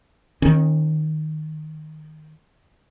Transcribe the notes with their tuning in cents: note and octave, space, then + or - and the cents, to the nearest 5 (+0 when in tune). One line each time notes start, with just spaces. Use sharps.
D#3 -5 C#4 -40